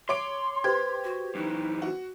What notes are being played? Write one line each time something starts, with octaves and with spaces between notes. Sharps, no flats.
C#5 C6 D6 D7
G4 B4 C5 G#6
F#4
F#2 E3 D#4
F#4